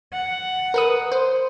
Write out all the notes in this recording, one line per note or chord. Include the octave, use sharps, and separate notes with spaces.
F#5
A#4 B4 D#6
C5